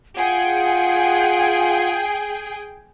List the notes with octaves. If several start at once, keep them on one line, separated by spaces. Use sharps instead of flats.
F4 G#4 F#5 G5